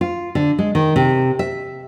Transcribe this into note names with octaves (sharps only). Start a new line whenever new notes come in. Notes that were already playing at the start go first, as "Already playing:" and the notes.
F4
D3
G#3
D#3
C3
E5